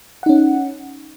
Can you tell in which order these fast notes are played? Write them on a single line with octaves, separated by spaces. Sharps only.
F#5 D#4 C#4